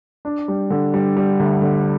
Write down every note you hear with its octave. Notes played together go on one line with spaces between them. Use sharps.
D4
G3
D3
G3
G3
D2
D3